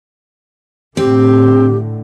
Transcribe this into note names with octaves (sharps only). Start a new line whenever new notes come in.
A2 D3 C4 G4